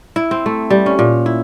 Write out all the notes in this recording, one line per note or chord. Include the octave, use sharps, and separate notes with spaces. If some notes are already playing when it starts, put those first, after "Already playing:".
E4
C4
A3
G3
C#4
A#2
E4